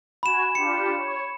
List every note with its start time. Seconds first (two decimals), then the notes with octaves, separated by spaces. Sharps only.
0.23 F#4 G#5 B5 E7
0.55 D4 F4 G4 C#7
0.98 C#5